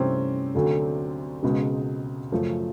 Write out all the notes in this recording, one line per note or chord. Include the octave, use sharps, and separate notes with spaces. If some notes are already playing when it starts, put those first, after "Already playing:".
Already playing: G2 C3 E3 A3 C4 C#4
D2 D3 F#3 A3
C#2 B2 G#3
F#2 C#3 F3 A3